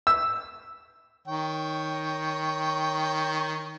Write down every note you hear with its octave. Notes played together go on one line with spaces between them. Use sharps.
E6
D#3 C#5 G5